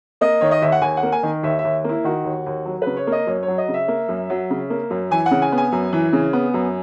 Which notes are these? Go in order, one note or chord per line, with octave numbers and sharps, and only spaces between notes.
A#3 D#5
D#3 C#5
D#5
D#2 E5
F#5
D#2 G#5
F#5
A#3
G#5
D#3
D#2 E5
E5
D#2
A#3 E4
D#3 F#4
D#2
D#2
F#3
C#3 B4
C#5
A#3
D#5
F#2 C#5
F#3 C#5
D#5
C#3
E5
A#3
F#2
F#3
C#3
A#3
F#2
E3 G#5
F#5
C#3
G#5
B3
G#5
F#2
E3
C#3
B3
F#2